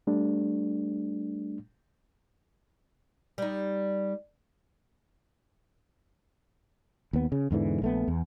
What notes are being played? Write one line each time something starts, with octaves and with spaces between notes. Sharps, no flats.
G3 A3 D4
G3 D#4
D#2 B3
C#3
E2 G#2 D3 E3
A#1 A3 B3
E2